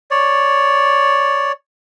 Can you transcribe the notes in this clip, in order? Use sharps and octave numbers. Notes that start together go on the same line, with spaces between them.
C#5 D5